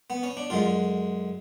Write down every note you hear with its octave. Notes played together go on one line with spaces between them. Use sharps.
B3
C#4
D4
F#2 D3 G#3 F4